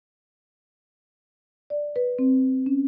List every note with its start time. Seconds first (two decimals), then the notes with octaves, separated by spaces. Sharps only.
1.70 D5
1.96 B4
2.19 C4
2.66 C#4